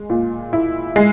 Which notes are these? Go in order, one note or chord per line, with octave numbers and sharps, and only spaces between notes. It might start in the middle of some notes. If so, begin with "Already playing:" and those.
Already playing: G#3
A#2
E4
G#3